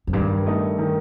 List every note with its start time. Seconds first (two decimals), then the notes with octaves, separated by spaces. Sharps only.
0.07 F2
0.13 G2 D#3
0.46 A3 D#4
0.79 D#3